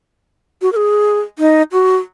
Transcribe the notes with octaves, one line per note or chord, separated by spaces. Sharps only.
F#4
A#4
G#4
D#4
F#4